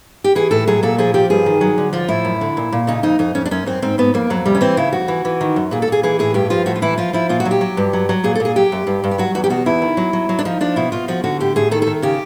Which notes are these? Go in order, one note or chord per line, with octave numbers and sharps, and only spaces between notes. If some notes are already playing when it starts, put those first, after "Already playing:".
G4
E3 G#4
A2 A4
F#3 G#4
A#2 A4
F3 G#4
F3 G4
G2 G#4
D#3
F#3
D3
F3 F4
A2 E4
F#2
D3
A#2
A#2
C#3 D#4
F2 D#4
F2 D#4
F2 C#4
D4
F#2 C#4
F#2 C4
G#2 C4
G#2 B3
F2 A#3
F2 F#3
C3 G3
C#4
E3 C4
C#3 E4
F2 F#4
E3
E3
D#3
F#2
A#2 G#4
A4
A#2 G#4
E3 G#4
A2 G#4
G2 G4
F3 F4
A2 F#4
F4
E3 E4
F3 F4
F3 E4
A#2 F4
F#4
F#3
G4
F#3
G2
F#3
F#3
A#2 G#4
A4
A#2 G#4
F#3 G4
F#2
G2
G2
G4
F#3 F#4
E2 F#4
G4
B2 F#4
E2 E4
D#3
F#3
F#3
F#3
D4
F3 D#4
F3 D4
B2 E4
B2 F4
F3 F#4
D3 F#4
A2 G4
A2 G#4
D#3 A4
A4
D#3
C#3 G4